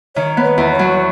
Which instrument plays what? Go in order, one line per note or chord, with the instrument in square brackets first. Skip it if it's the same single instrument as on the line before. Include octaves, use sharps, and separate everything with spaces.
[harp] D#3 [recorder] C#5
[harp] B3
[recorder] B4
[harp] E2
[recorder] C#5
[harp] F#3